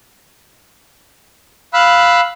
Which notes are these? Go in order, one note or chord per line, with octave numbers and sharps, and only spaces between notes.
F5 B5 E6 F#6